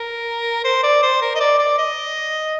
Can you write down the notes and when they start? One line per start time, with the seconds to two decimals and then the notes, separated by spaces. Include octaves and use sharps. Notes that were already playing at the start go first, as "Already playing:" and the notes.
Already playing: A#4
0.65 C5
0.83 D5
1.03 C5
1.22 A#4
1.35 D#5
1.40 D5
1.59 D5
1.78 D#5